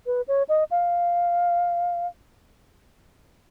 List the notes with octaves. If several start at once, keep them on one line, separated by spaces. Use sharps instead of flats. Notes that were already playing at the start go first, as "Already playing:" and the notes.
B4
C#5
D#5
F5